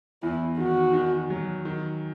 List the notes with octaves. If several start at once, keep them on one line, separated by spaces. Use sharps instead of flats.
E2 E4
D#3 F#4
D#3
F#3
D#3